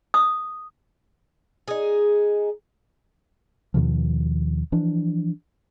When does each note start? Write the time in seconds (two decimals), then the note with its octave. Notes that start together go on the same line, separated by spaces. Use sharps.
0.14 D#6
1.68 D#4 G#4
3.74 D#2 B2 D#3 F3
4.72 E3 F3 D4